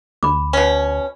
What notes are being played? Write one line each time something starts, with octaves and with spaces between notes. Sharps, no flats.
D2 B5 D6
B2 C#4